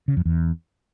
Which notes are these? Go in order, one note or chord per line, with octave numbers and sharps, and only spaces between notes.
C#3
F2
E2